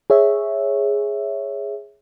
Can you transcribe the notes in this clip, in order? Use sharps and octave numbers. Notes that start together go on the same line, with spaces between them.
G#4 C#5 E5